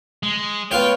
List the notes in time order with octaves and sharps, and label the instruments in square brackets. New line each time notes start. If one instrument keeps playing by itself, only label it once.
[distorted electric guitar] G#3
[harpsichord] B3 F4 C#5 [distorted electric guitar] G5